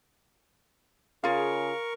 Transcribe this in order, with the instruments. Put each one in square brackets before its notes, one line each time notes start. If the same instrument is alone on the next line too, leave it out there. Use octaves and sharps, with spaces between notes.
[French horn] C#3 [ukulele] F4 G#4 [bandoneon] A#4 C#6 [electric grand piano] F5